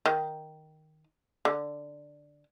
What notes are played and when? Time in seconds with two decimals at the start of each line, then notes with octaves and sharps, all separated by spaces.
0.06 D#3
1.45 D3